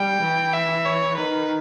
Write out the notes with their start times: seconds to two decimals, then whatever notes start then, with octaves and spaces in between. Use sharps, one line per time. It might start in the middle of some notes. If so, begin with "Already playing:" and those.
Already playing: G3 G5
0.22 E3
0.53 E5
0.86 C#5
1.17 D#3 B4